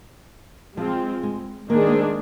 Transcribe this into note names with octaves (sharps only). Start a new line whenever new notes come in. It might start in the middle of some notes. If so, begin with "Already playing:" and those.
F3 G#3 C4 F4
G#3
D#3 G#3 A#3 D4 G#4
A#3
C4